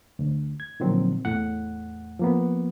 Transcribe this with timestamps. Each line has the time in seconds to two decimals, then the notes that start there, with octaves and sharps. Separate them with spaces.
0.19 D2
0.60 G#6
0.80 A#2 D3 D#3 F3 F#3 C4
1.25 E2 A2 F#5
2.20 F3 A#3 B3